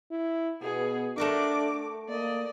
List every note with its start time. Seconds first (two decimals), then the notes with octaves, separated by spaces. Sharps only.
0.11 E4
0.62 B2 B3 G#4
1.18 A3 D4 F#4 A#4 D6
2.09 A#3 D5 D#5